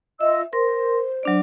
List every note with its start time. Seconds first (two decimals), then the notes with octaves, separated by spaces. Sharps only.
0.21 F4 D#5 E5 E6
0.53 A#4 C5 C6
1.23 F#3 D4 D5